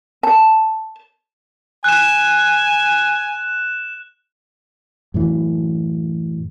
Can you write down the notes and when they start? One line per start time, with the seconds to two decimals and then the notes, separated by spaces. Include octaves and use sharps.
0.23 A5
1.84 G#5 F#6 E7
5.14 F#2 A2 E3